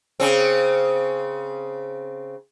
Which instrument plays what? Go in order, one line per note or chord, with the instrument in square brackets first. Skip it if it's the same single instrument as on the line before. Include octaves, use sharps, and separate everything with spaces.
[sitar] C#3 C4